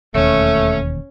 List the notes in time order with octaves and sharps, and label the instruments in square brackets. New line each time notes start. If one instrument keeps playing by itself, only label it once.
[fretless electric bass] E1 D#2 [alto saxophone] A3 [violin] C#4